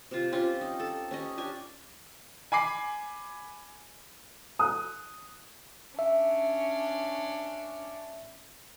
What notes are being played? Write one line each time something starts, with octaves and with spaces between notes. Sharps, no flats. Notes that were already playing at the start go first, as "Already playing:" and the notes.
C3 F4
C4 C#4 F4 G4
D#4
A4
C#4 G4 D#5
D4 G4 G#5
G#5 B5 D6 C7
D#6 F#6
C#4 D4 E5